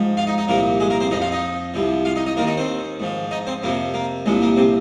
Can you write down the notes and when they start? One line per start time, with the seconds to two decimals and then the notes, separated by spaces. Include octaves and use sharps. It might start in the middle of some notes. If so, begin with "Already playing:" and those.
Already playing: G#2 F3
0.17 F4 F5
0.27 D#4 D#5
0.38 D#4 D#5
0.48 C2 A#2 F3 A#3 A#4
0.80 G#3 G#4
0.90 A#3 A#4
1.00 C4 C5
1.11 F2 F3 D#4 D#5
1.22 F4 F5
1.32 D#4 D#5
1.74 C2 C3 F3
2.05 F4 F5
2.16 D#4 D#5
2.26 D#4 D#5
2.37 D#2 D#3 A#3 A#4
2.47 D#4 D#5
2.57 C4 C5
3.00 G#2 F3
3.31 D#4 D#5
3.47 C4 C5
3.63 F2 C3 F3 A#3
3.94 A#3
4.26 C2 A#2 F3 G#3
4.42 A#3
4.57 C3 C4